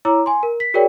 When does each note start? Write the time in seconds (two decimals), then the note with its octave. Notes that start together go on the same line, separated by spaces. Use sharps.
0.05 E4 C#5 A#5 D6 E6
0.26 G#5 C6
0.43 A#4
0.60 B6
0.74 F#4 G#4 A#4 C#5 D5 G5